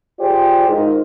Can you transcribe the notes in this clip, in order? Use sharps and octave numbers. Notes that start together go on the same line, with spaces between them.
F4 G4 G#4 C5 D5
G#2 D#4 F4 A#4 C5